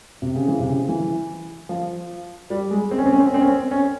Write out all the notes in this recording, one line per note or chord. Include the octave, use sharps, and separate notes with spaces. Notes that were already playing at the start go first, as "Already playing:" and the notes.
C3
C#3
E3
C3
C#3
E3
F3
G3
G#3
C4
C#4
C4
C#4
C4
C#4
C4
C#4
C4
C#4